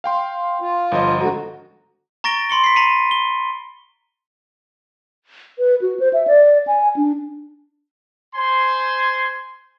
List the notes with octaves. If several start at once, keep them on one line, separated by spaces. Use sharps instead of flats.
F5 G5 C6
F4
G1 F3 D#5
G#2 D3 F#4 A#5
A#5 C#6 A6 A#6 D7 G7
B5 C6 C#7 G7
B6 C7
A#5 B5 C#7 D#7
G7
B4
F#4
C5
E5
D5
G#5
D4
C5 G#5 C6